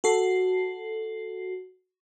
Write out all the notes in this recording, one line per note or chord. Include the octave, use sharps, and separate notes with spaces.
F#4 A4 C7